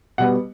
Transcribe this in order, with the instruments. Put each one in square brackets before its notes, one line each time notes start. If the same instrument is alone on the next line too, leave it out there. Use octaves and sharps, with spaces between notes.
[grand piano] B2 G3 B3 F#5